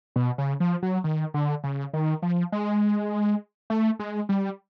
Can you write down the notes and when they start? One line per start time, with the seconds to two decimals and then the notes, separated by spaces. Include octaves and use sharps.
0.16 B2
0.38 C#3
0.60 F3
0.83 F#3
1.04 D#3
1.34 D3
1.64 C#3
1.93 D#3
2.22 F3
2.52 G#3
3.70 A3
3.99 G#3
4.29 G3